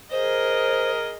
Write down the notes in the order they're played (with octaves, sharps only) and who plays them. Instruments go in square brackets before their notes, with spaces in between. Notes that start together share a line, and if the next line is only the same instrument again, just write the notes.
[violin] G#4 D#5 [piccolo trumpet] A#4 [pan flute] C5